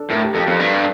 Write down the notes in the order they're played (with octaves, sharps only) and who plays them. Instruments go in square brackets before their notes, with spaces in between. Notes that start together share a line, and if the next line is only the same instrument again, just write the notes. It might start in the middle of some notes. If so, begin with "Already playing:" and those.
Already playing: [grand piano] D4 A4
[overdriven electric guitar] A2 [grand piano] A#4
[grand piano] G4
[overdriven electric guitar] F2 [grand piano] A4
[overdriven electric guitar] F2
G2